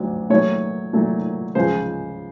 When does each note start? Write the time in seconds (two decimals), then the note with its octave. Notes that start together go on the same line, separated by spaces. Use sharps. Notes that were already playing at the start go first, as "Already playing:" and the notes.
Already playing: D2 D3 F#3
0.30 A#2 F#3 A3 C#5
0.93 A#2 F#3 A3
1.55 C#2 C#3 F3 G#3 C5